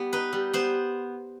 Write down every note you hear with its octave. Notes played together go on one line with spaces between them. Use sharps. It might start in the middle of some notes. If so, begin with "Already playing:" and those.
Already playing: G3 B3
D#4 B4
G3
B3 C5